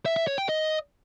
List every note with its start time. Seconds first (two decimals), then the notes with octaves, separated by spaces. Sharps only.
0.06 E5
0.16 E5
0.27 C#5
0.38 G5
0.49 D#5